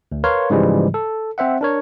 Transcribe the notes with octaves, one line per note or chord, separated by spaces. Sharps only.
D2
A#4 B4 C#5 F5 C6
G#2 C#3 E3 F3 G3 G#3
A4
C4 C5 E5 F#5
D4 A#4 C#5